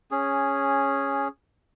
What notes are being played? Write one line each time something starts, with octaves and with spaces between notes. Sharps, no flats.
C#4 G#4